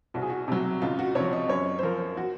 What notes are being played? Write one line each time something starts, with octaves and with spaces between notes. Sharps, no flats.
C2 F#4
G#4
F#4
C3 F#3
C#2 F4
F#4
C3 F3 C#5
D#5
F#2 C#5
C5
F3 A#4
F#4